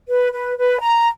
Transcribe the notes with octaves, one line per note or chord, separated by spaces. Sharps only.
B4
B4
B4
A#5